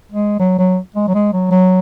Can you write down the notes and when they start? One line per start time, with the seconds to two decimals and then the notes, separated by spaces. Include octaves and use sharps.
0.12 G#3
0.40 F#3
0.59 F#3
0.96 G#3
1.08 F#3
1.15 G#3
1.33 F#3
1.51 F#3